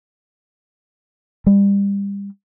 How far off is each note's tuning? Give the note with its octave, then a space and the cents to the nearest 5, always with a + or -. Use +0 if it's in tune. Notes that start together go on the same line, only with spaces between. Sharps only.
G3 +30